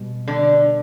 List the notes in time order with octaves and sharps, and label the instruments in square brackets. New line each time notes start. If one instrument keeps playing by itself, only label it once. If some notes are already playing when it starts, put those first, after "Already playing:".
Already playing: [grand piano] B2 G3
[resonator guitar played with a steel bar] D3